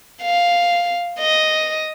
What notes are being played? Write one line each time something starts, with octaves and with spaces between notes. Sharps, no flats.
F5
D#5